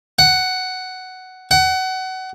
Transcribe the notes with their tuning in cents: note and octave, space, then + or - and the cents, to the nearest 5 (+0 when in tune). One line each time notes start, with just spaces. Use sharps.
F#5 +10
F#5 +25